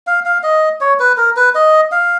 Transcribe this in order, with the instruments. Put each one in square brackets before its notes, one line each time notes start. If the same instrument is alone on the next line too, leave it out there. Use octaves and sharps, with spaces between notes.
[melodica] F5
F5
D#5
C#5
B4
A#4
B4
D#5
F5